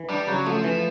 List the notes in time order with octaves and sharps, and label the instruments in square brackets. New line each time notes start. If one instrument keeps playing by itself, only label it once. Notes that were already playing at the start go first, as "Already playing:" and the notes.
Already playing: [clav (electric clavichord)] E3
[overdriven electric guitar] G3 [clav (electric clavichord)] D4
[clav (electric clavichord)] C#3 [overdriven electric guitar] F#3
[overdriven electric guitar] F3 [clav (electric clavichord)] A3
[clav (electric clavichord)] E3